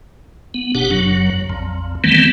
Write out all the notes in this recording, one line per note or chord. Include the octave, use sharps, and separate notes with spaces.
B3
F#1 B2 D4 G4 F#5
F#1 F#2 F#3
A#1 F2
D#3 E3 G3 A3 B3 C4